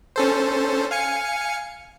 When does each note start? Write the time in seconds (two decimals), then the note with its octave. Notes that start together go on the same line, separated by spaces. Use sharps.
0.16 C#4 A4 C5
0.91 F5 G#5 C#7